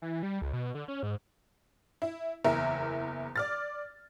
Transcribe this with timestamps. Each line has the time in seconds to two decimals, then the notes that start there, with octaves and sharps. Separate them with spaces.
0.02 E3
0.23 G3
0.42 C#2
0.53 B2
0.75 D3
0.88 C#4
1.03 G#2
2.02 E4
2.45 F#1 E2 E4 A#4 E5
3.36 D5 F6 A6